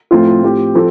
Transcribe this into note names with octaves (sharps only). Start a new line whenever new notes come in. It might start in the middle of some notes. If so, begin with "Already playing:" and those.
A2 F3 A3 C4 F4
A2 F3 C4 G4
F3 C4 A4